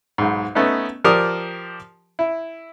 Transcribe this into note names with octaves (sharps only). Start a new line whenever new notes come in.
B1 G#2
A3 B3 C#4 D#4
F3 G4 A#4 D5 D#6
E4